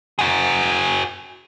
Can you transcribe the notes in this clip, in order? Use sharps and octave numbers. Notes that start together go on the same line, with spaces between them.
F#4 G#4